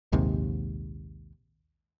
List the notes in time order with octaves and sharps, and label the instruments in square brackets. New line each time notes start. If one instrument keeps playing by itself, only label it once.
[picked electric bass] A#1 D#2 G#2 C3